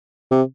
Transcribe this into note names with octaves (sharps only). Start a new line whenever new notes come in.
C3